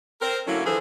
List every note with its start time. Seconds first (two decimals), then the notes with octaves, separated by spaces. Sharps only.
0.22 C4 A#4 C5
0.46 D3 F#3 A3 A#3 C#4 E4
0.65 D3 E3 F3 G#4 A4 C5